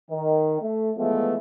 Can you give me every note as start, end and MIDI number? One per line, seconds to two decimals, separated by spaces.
0.10 0.60 51
0.62 0.91 57
0.97 1.36 45
0.97 1.36 52
0.97 1.36 53
0.97 1.36 56
0.97 1.36 57
0.97 1.36 59